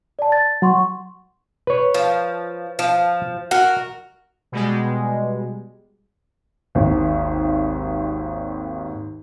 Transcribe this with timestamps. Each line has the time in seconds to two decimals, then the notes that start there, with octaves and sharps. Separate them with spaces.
0.19 D5 A5
0.32 A6
0.62 F#3 F#5 C6 C#6
1.67 B4 C#5
1.94 F3
2.79 F3
3.51 F#4 A#4 F#5
4.52 B2 G3 G#3
6.75 G#1 D#2